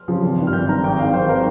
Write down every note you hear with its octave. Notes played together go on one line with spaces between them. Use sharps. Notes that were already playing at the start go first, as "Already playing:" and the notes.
Already playing: F6
C#3 F3
G#1
G2 D#3
F6
G#1 G6
G2 D#3 A#5
G#1 G5
G#2 D#3 F5
G#1 C5
D#3 A#4